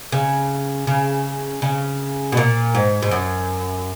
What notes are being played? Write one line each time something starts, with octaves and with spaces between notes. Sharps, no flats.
C#3
C#3
C#3
B2
A#2
G#2
G#2
F#2